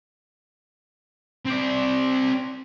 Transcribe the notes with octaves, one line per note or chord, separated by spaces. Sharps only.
C4 D5